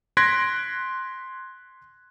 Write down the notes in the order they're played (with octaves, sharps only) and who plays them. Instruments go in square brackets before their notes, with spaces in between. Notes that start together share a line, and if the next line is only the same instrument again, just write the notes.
[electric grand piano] C6 F#6 G#6 A#6 B6 D7